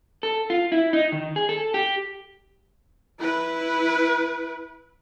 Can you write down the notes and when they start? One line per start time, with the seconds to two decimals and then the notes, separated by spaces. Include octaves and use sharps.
0.23 A4
0.50 F4
0.72 E4
0.93 D#4
1.12 D#3
1.36 G#4
1.49 A4
1.74 G4
3.20 E4 B4